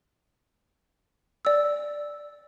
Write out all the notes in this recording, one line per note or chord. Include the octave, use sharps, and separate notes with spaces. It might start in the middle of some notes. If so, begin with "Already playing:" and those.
D5 E6